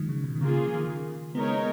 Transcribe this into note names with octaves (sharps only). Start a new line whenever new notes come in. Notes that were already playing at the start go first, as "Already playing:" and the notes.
Already playing: D#3 F3 F#3 G#3
C#3
B2
D#3
C#3 A#3 F4 G#4
F3
D#3
C#3
G#3 B3 D#4 A#4 C#5
B3